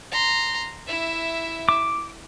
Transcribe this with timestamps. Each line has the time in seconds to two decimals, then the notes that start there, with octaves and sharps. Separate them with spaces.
0.12 A#5 C6
0.87 E4 E5
1.69 D6